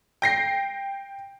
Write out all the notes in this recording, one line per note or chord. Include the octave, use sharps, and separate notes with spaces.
G5 A#6 C7